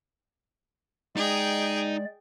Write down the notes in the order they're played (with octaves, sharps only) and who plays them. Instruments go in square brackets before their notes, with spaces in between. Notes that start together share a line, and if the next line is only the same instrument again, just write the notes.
[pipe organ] G#3 D5 [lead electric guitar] D#4 D#5 [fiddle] G#4 G5